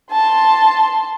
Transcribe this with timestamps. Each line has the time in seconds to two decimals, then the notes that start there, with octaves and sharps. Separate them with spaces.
0.11 A5 C6